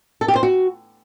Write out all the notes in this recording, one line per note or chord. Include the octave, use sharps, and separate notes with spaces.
A4
G4
C5
F#4